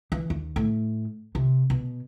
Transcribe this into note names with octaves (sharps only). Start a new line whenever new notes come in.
E3
D#2
A2
C3
B2